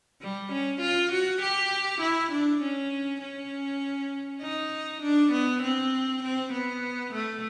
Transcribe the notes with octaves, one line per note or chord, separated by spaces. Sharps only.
G3
C#4
F4
F#4
G4
E4
D4
C#4
C#4
D#4
D4
B3
C4
C4
B3
A3